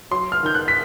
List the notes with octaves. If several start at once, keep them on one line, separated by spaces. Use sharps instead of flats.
F#3 C6
F6
D#3 G6
F#6
B6